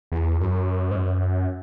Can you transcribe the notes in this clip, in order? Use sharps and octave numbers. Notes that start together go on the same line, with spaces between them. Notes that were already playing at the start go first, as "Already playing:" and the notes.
E2
F#2
G#2
F#2